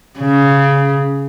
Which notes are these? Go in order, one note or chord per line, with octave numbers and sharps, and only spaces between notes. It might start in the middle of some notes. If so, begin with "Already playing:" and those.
C#3